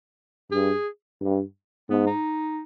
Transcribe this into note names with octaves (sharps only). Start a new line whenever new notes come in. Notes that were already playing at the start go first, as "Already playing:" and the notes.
G2 G#4
G2
G#2 B3
D#4